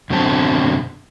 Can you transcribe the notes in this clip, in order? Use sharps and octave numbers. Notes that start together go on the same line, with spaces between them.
F#2 B2 D3 C4 A5